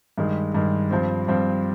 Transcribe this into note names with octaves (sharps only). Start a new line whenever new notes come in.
G2 D#3 G#3
G2 D#3 G#3
G2 F3 C4
G2 F3 C4